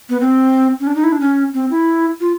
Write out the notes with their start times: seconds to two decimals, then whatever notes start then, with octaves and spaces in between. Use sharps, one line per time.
0.09 B3
0.21 C4
0.80 C#4
0.87 D4
0.95 D#4
1.04 E4
1.12 D4
1.20 C#4
1.54 C4
1.71 E4
2.21 F4